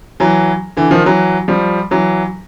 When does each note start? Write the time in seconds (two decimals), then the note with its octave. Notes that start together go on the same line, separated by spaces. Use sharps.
0.20 E3 F#3
0.77 D3 E3
0.91 D#3 F3
1.05 E3 F#3
1.48 F3 G3
1.91 E3 F#3